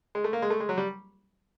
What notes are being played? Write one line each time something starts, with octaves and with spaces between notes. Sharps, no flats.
G#3
A3
A#3
G#3
A3
G#3
F#3
G3